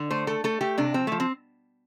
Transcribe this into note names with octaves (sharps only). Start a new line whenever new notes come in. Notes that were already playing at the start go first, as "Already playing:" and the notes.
Already playing: D3
A3 C5
A3 A4
A3 A4
A3 G4
C3 D4
F3 C4
F3 A3
C4